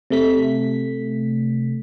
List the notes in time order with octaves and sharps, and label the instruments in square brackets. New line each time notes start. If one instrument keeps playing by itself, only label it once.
[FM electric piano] C3 A3 B6